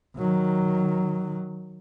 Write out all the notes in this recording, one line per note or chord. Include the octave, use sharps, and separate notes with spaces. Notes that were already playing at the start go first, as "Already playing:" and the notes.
D#3 F#3